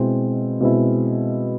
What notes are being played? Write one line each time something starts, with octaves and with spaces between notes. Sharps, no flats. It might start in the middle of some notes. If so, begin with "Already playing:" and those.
Already playing: B2 G#3 C4 E4
B2 G#3 C4 E4